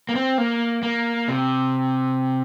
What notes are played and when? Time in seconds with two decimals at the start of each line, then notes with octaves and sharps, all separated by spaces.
0.09 A#3
0.15 C4
0.38 A#3
0.83 A#3
1.28 C3